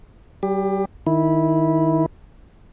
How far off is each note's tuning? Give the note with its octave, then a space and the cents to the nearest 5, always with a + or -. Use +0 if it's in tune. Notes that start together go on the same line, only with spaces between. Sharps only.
G3 -35 G4 +25
D#3 +0 E4 -15